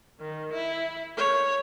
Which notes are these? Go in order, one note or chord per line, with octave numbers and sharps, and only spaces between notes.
D#3
E4
C#5